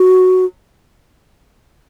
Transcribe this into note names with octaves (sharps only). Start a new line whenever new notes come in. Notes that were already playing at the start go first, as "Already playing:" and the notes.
Already playing: F#4